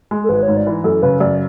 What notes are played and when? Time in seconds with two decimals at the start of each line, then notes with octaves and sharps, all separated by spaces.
0.11 G#3
0.24 A4
0.29 G#1 B4
0.43 C#5
0.48 G#2
0.57 D5
0.66 E3
0.84 F#2 A4
1.03 C#3 B4
1.20 F#2 D5